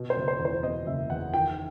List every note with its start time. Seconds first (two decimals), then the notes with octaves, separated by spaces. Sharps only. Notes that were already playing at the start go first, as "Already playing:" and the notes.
Already playing: B2
0.10 C5
0.16 F#1
0.28 C5
0.39 E2
0.45 C5
0.63 B2 D#5
0.86 F#1 E5
1.10 E2 F#5
1.34 D#3 G5